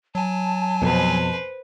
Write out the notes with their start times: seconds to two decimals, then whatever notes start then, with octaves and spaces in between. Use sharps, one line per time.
0.15 F#3 G#5 A5
0.82 F2 B2 B4 C5